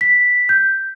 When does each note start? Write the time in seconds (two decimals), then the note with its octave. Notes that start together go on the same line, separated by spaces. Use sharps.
0.01 B6
0.49 G6